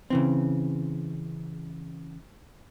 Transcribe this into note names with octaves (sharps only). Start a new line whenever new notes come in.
C#3 E3 C4